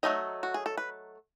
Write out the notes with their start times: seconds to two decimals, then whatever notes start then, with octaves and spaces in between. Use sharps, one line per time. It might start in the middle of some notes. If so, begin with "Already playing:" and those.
0.03 F#3 A3 D#4 D#5
0.43 F#4
0.54 G#4
0.66 A4
0.78 B4